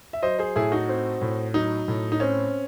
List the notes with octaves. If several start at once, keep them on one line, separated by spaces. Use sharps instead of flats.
E5
F#3 C5 D#5
G#4 C5
A2 E4 G#4
D#4 F#4
C4
A2
F#3 D#4
A2
D#4
C4 C#4